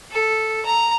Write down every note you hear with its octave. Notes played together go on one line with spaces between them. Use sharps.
A4
A#5